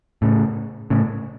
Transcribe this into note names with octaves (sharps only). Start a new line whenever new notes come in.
A2 C#3
A2 C#3